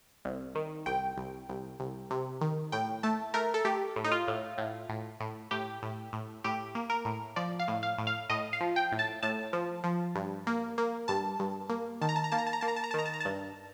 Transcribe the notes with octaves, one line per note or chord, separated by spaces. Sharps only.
C2
D#3
C2 G5
C2
C2
C2
C3
D#3
A2 G5
A3 A5
A3 A#4
A4
A3 G4
A2
D#4
F4
A2
A2
A2
A2
A2 G4
A2
A2
A2 G4
A#3
A#4
A2
F3 D5
F5
A2
F5
A2
F5
A2 D#5
F5
F3
G5
A2
A5
A2 A5
F3
F3
G2
A#3
A#3
G2 A5
G2
A#3
D#3 A5
A#5
A5
A#5
A#3 A5
A#5
A5
A#5
A#3 A5
A#5
A5
A#5
A5
D#3 A#5
A5
A#5
G2 A5